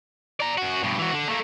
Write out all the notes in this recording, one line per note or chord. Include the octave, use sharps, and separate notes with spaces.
D5 A#5
F#2 F#4
G2 B2
E3 F#4
D3
A3 A#3